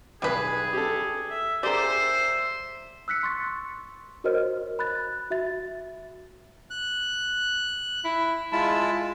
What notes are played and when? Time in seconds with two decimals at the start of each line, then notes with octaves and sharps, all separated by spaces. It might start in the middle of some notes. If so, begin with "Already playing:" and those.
0.22 B1 G3 G#4 B4 G#5
0.73 G4 A4
1.30 E5
1.63 G4 G#4 A#4 C5 D5 E5
3.08 E6 F#6 B6 C#7
3.23 C6 C#6 A6
4.24 F#4 A#4 C5 C#5 D#5 F6
4.79 B5 F#6 A6
5.30 F#4 E5 A6
6.70 F#6
8.05 E4
8.52 G#3 E4 F4 A5